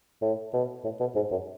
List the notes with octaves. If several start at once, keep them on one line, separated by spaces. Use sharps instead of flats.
A2
B2
A2
B2
G#2
F#2